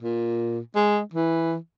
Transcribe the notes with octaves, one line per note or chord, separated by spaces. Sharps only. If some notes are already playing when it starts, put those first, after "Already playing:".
A#2
G#3
E3